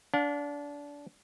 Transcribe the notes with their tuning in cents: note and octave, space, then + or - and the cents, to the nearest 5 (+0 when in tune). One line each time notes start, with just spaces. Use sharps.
D4 -25 F5 +40